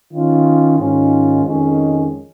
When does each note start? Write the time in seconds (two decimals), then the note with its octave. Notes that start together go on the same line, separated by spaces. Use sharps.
0.12 D#3 C#4 F4
0.78 G#2 D#3 C#4 F4
1.44 F2 D#3 G#3 C#4